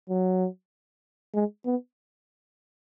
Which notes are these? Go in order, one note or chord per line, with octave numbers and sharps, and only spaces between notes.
F#3
G#3
B3